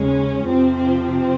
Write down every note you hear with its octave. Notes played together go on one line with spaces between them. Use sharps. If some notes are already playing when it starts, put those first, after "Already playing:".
Already playing: D#2 C#3 G#3 C#4
F2 C3 F3 C4
C4
C4